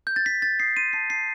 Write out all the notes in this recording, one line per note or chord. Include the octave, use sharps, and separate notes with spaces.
G6
A6
G6 B6
G6 A6
D#6 C7
C6 D#7
A5 C7
A5 C7